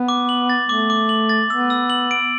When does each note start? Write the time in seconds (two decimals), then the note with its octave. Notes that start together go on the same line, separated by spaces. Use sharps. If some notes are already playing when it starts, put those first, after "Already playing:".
Already playing: B3
0.08 D6
0.29 F#7
0.50 A6
0.69 A3 D6
0.90 D6
1.09 F#7
1.29 A6
1.50 B3 E6
1.70 E6
1.90 F#7
2.11 D7